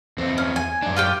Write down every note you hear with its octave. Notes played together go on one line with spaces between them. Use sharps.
E2 C4
C#4
G#5
F#2 D4
F4 G4 G5